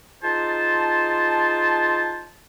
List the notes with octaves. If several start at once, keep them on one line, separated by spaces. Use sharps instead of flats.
D#4 F4 G#4 C5 A5